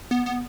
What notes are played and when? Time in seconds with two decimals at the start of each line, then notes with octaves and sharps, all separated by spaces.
0.11 B3
0.26 B3